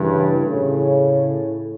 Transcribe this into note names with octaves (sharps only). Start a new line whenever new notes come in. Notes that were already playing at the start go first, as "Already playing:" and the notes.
Already playing: G2 C#3 E3
A2 C#3